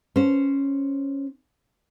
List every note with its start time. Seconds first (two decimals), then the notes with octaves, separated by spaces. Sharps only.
0.16 C#4 C5